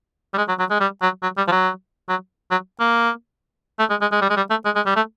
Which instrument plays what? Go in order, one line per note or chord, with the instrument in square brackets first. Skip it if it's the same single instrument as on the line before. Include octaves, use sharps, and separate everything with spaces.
[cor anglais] G3
G#3
F#3
F#3
G#3
G3
F#3
F#3
G3
F3
F#3
F#3
F#3
A#3
A3
G#3
G#3
G#3
G3
G#3
G3
A3
G#3
G#3
G3
A3